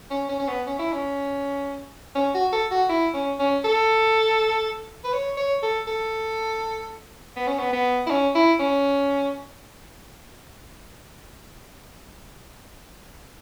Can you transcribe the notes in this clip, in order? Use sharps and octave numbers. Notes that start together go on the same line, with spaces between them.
C#4
C#4
C#4
B3
C#4
E4
C#4
C#4
F#4
A4
F#4
E4
C#4
C#4
A4
B4
C#5
C#5
A4
A4
B3
C#4
B3
B3
E4
C#4
E4
C#4